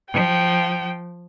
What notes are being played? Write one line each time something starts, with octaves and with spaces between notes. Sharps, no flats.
F3 G5